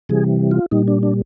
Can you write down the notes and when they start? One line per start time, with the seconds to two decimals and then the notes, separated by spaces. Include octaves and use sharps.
0.09 C3 E3 G3 G#4
0.51 F4
0.71 A#2 G3 D#4
0.88 D4
1.03 D4